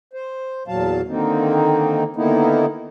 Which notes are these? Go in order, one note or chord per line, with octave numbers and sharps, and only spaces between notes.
C5
E2 A#2 F#3 F5 A5
D3 D#3 A#3 C4 D#4
D3 D#3 A#3 B3 D#4 E4